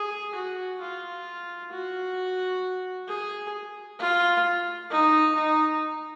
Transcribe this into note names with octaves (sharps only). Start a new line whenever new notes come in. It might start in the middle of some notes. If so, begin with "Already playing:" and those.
Already playing: G#4
F#4
F4
F#4
G#4
F4
D#4
D#4